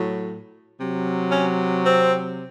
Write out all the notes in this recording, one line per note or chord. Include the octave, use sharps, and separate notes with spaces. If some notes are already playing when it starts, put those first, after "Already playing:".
Already playing: A2 F#3
C3 F#3
C#4
C4